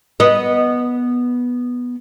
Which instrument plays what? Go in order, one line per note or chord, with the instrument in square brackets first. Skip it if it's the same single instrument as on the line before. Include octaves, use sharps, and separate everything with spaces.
[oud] B3 D#5